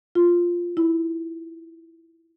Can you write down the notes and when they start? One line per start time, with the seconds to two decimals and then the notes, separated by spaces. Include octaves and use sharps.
0.15 F4
0.77 E4